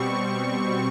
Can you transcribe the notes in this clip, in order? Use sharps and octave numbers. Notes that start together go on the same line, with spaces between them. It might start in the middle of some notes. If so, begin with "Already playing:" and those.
Already playing: B2 G3 C4 C#6